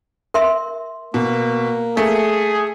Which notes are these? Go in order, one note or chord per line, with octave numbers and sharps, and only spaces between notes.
A#4 E5 C6
B2 A#3
A3 G#4